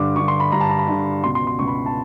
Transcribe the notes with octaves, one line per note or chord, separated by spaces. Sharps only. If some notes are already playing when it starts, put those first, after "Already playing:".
Already playing: G2 D3 D6
G2 D3 C#6
C6
B5
G2 D3 A#5
A5
A#5
B5
G2 D3
C#2 B2 C6
C6
C6
C#2 B2 C#6
B5
A5